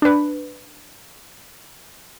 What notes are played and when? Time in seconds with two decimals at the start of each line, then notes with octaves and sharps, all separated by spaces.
0.02 D4 B4